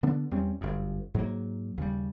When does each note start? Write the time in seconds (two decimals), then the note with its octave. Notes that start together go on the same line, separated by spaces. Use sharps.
0.03 D3 B3 D4
0.31 E2 G3 C4 C#4
0.61 G1 F#2
1.14 G#2 F#3 A#3
1.77 D#2 C#3 G3